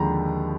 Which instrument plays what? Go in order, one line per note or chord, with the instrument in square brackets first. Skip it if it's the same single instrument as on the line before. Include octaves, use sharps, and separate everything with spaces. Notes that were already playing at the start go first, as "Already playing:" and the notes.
Already playing: [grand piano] D#2 D3 F3 G#3 A#5 B5